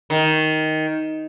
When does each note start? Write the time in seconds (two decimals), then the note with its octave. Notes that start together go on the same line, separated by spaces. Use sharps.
0.10 D#3